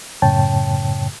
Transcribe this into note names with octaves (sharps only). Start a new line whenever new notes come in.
F#2 A2 C#3 C#5 G5 A5